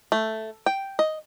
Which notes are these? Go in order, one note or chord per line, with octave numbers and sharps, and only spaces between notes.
A3
G5
D#5